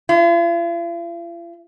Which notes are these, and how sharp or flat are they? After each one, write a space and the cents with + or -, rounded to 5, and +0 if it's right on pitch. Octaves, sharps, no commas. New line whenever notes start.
F4 -45